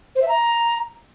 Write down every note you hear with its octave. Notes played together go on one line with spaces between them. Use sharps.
C5
E5
A#5